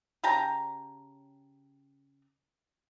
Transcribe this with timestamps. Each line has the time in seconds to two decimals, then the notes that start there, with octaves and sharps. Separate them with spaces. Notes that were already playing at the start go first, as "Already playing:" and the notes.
0.24 C#3 G4 A5 A#5